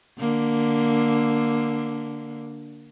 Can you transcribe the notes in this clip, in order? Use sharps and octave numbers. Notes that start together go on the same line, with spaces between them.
D3 A#3